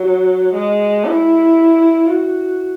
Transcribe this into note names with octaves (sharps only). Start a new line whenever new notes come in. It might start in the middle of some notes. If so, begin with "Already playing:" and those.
Already playing: F#3
G#3
E4
F#4